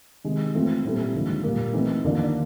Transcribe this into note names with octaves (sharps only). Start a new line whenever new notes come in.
C3 D#3 G#3
E3 A3 C4 F4
A#2 G3 C4 E4 A4
D#2 D3 F3 G#3
A#2 G3 A#3
E3 A3 C4 D#4
D#2 D3 F3 A#3 D4